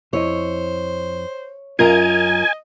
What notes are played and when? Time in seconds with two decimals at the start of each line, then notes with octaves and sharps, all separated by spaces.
0.13 F2 E4 C5 C#5 D#5
1.79 F#2 F4 A#4 D#5 F5 G#5 A#5